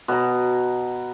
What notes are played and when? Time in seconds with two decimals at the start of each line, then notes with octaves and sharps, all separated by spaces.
0.08 B2 A#5